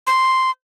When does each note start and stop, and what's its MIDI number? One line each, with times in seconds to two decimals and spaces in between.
0.07 0.51 84